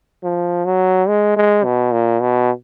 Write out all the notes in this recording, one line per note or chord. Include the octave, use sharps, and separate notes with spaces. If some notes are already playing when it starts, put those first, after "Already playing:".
F3
F#3
G#3
G#3
B2
A#2
B2